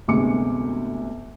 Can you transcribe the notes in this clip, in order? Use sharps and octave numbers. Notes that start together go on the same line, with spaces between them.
G1 D2 C3 G#3 D6 C#7